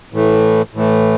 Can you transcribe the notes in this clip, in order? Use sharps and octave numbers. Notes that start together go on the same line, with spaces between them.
A2 E3 A3
A2 E3 A3